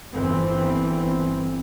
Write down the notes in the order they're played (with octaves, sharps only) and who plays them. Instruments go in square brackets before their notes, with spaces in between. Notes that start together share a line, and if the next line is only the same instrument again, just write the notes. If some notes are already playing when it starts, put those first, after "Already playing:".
[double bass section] G1 E3 C4